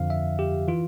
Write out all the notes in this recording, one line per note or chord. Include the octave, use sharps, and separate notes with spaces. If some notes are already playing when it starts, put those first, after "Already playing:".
Already playing: F2 D3 F3 F5
E5
G4
E3 F4